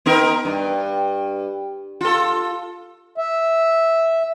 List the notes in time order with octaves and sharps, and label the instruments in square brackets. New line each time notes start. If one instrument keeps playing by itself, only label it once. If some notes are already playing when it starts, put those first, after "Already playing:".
[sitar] B3 D#4 A#4
G2
F4 A4
[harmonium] E5